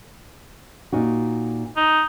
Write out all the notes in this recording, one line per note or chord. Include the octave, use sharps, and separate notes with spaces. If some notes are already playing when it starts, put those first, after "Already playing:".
A#2 D#4 F#4
D#4